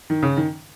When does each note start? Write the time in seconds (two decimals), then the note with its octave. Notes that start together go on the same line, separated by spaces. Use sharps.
0.10 D#3
0.23 C#3
0.37 D#3